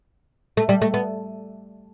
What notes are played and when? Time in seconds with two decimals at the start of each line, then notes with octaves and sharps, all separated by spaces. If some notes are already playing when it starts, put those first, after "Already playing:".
0.57 A3
0.69 G3
0.82 A3
0.94 B3